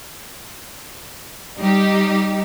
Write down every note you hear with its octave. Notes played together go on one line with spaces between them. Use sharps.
G3 D#4 G4